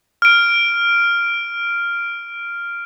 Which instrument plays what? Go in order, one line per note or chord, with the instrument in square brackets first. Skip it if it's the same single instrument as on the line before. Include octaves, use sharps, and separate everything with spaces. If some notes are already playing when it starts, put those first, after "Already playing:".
[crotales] F6 D7